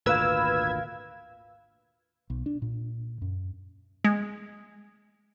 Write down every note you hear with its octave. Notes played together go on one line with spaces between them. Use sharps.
G#1 D2 A#2 A#4 B4 F5 E6 G#6
B1
D4
A#2
F#2
G#3